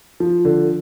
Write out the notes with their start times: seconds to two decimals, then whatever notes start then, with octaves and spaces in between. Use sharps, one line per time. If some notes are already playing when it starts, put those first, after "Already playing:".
0.20 F3
0.45 D3